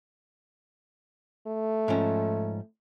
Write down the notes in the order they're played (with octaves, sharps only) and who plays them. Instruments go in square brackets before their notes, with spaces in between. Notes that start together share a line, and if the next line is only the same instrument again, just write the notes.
[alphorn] A3
[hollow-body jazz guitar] G#2 F3 C#4